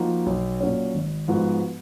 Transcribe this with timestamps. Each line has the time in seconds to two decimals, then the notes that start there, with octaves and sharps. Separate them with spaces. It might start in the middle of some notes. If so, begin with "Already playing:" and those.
Already playing: F3 A#3 D#4 F#4
0.26 B1
0.60 A#2 F#3 C#4
0.94 G#1
1.28 G#2 F3 B3 F#4